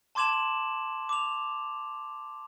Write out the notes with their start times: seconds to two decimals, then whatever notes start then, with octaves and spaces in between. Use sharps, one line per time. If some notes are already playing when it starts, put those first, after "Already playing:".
0.15 A5 C6 D6 G#6 E7 F#7
1.09 D6 F7